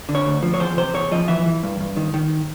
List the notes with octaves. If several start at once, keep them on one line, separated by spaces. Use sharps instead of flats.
D3
C#5
D2
F3
C#5
E2 C5
C3 C5
E2 C#5
F3 D#5
E3 E5
E3
G2
G2
D#3
D#3